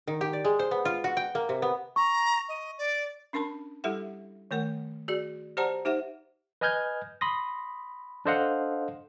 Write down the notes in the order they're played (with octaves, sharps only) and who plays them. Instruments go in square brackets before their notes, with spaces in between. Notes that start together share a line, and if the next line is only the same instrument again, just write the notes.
[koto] D#3
G4
D5
G#3
C5
B3
F4
F#4
G5
A#3
C3
B3
[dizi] A#5 [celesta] C#6
[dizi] D#5
D5
[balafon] C#4 D4 A#4 A5 B5
G3 E4 G4 A4 E5 F#5
D#3 A3 A#4 F#5
F#4 G#4 D5
G4 C5 D5 F#5 A5 A#5
D#4 G4 C5 E5 F#5
[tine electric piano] B4 D#5 G#5 F6 G6 G#6
B5 C6 D#6 A#6
D4 A4 C5 D#5 F5 F#5